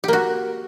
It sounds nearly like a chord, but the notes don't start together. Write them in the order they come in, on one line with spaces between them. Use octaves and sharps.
G4 A#3 F#4